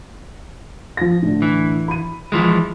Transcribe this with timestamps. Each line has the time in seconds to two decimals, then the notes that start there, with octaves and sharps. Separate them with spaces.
0.97 F3 A#6
1.22 A2 D3
1.42 E3
1.88 B5 D#7
2.32 E3 F3 G#3